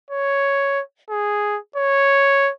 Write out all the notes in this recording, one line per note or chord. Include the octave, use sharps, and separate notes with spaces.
C#5
G#4
C#5